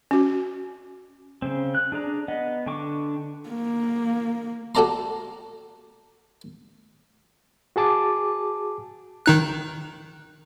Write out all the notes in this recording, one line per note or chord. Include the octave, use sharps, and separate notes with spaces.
C#4 F#4
C#3 C4
F#6
D4 G#4 D5 A#5
B3 D#5 F#5
D3 D4 G5 C#6 D6
A#3
F#4 G4 A4 D5 A#5 C6
F#4 G#4 A5 D6
D#3 D#4 F#6